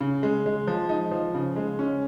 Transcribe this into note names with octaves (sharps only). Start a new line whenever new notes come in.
C#3
G#3
G#3
F3
D#4
F3
C#3
G#3
C#4